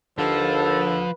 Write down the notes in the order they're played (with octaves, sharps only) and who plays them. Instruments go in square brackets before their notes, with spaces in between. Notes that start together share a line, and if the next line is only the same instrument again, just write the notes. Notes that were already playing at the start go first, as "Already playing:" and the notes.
[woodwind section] D#2 A4 [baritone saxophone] D3 [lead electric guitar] F3 [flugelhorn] B4